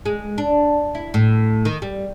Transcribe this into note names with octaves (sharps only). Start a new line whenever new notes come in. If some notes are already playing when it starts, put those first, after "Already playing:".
G#3
D4
E4
A2
D#3
G3